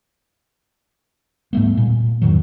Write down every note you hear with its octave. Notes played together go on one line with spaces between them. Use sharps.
G#2 G3 A3 B3
A#2
F2 G#2 D#3 F#3